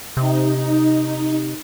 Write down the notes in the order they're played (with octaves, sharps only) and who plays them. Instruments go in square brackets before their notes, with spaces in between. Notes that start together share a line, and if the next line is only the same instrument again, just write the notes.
[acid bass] C3 [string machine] D#4